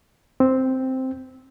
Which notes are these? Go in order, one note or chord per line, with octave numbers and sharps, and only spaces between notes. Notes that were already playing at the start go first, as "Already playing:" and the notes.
C4